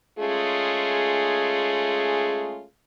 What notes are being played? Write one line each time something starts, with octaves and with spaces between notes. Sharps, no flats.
G#3 A3 C#4 F4 G#4